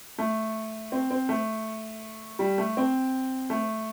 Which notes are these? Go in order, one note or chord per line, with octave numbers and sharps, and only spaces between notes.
A3
C4
C4
A3
G3
A3
C4
A3